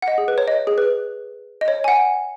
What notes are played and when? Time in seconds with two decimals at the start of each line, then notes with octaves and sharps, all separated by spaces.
0.02 F#5
0.08 D#5
0.18 G#4
0.28 B4
0.38 C#5
0.48 D#5
0.67 G#4
0.78 B4
1.61 D#5
1.68 C#5
1.84 G#5
1.88 F#5